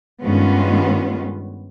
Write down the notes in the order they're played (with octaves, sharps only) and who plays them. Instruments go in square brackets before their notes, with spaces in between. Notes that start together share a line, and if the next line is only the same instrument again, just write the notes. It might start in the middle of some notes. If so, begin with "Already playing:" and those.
[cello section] G2 D#3 G#3 B3 C#4 F4